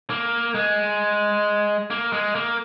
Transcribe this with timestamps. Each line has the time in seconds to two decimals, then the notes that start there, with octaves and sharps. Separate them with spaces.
0.10 A#3
0.55 G#3
1.90 A#3
2.12 G#3
2.35 A#3